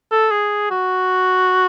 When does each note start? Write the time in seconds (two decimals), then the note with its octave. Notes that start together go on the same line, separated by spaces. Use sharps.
0.12 A4
0.31 G#4
0.70 F#4